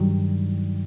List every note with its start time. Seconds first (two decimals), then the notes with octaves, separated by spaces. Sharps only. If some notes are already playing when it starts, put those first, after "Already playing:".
Already playing: G2 D#3 F#3